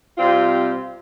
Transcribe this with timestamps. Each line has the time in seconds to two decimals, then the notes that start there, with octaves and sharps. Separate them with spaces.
0.17 C3 G3 C4 F4